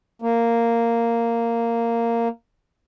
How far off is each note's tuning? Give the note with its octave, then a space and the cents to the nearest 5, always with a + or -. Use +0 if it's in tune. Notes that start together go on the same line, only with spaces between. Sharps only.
A#3 -10